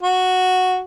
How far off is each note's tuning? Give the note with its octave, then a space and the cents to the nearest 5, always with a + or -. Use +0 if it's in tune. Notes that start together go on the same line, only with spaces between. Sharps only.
F#4 -5